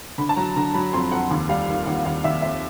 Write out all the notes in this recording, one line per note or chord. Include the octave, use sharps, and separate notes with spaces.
D3 B5
A5
F#3 A#5
D3 A#5
F#3 B5
F2 C6
F2 F#5
D#2
G3 F5
D#3
D#2 F#5
D#2 F5
D#2 E5
F2 E5